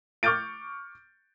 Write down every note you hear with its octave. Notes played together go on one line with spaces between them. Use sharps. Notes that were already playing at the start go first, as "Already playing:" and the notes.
C#6 D6 F6 G6 A6 D7